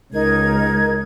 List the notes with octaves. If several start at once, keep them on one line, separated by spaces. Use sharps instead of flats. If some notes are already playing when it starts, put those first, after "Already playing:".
C#2 D#4 A#4 G#6